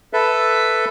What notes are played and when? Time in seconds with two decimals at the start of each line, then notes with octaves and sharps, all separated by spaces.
0.13 A4 B4 E5